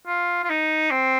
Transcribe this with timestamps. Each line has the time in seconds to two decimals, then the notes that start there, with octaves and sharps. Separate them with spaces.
0.07 F4
0.44 F4
0.49 D#4
0.91 C4